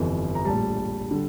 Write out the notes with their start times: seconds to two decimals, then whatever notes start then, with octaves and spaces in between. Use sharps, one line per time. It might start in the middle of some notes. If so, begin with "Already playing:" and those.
Already playing: G1 F2 E3
0.35 A#5
0.45 A#1 A2 G3 A5
1.11 D3 G3